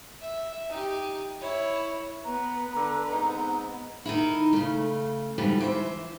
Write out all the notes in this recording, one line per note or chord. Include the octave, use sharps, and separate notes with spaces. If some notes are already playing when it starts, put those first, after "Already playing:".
E5
D#4 G4
E4 C#5
B3 B4 A#5
D3 B4
G#2 B3 C4 D#4
D#3 D#4 E4
C#3 A3
G#2 B2 D3 E3 F3 G3
E3 C5 E5